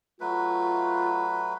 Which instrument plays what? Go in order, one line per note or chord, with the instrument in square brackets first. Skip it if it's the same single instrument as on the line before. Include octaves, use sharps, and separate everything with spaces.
[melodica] F#3 A3 B4 [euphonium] F4